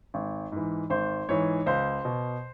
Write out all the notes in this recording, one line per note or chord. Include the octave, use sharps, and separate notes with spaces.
G#1
G#2 E3
G#1 C5
G#2 E3 C#5
C#2 C5
B2